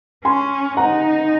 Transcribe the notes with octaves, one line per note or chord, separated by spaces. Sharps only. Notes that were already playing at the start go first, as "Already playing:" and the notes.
C#4 G#5 C6
D#4 F#5 A#5